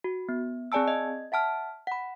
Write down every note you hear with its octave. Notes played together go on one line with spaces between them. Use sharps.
F#4
B3
C4 G#4 D5 G#5 A5 E6
D#5
E5 F#5 A5 F6
F#5 B5